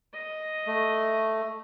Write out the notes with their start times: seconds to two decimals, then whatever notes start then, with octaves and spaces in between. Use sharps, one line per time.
0.14 D#5
0.67 A3